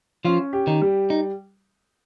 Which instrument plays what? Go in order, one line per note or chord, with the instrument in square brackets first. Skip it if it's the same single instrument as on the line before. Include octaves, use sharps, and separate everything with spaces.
[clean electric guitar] F3 F4 [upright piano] C#4
[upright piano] G4
[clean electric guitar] D#3 D#4
[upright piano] G3
[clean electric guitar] D#4